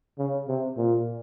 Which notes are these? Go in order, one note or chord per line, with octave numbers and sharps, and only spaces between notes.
C#3
C3
A#2